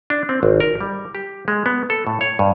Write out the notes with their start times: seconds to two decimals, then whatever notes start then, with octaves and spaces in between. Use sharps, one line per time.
0.10 D4
0.29 C4
0.43 G#1
0.60 A#4
0.81 G3
1.15 G4
1.48 G#3
1.66 B3
1.90 A4
2.07 A2
2.21 C#5
2.39 G2